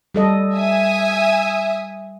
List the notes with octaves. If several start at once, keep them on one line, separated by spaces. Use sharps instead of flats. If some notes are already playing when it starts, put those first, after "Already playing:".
G3 A4 D#5
E5 G#5 D#6